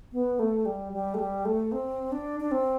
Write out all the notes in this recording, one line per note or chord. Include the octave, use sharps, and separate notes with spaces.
B3
A3
G3
G3
A3
G3
A3
C4
D4
D4
C4